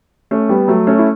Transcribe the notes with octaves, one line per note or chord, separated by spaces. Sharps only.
A3 C#4
G3 B3
F#3 A3
A3 C#4
E4